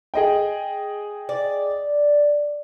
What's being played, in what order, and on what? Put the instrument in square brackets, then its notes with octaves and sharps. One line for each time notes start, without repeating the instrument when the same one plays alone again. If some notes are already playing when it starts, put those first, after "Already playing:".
[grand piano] G#4 D#5 G5
[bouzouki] D5